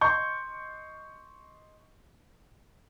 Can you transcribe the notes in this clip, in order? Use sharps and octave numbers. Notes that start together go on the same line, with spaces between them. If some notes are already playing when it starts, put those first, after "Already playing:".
D#5 C6 C#6 G6